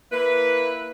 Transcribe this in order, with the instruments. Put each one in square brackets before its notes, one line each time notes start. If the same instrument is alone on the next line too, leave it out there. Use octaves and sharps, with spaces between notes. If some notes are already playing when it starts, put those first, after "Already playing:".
[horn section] A#3 E4 B4